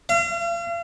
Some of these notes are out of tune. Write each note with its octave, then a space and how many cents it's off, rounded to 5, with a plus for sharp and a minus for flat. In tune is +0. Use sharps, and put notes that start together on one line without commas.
F5 -40